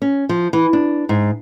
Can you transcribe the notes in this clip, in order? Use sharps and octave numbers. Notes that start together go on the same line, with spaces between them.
C#4
F3
E3
D4
G#2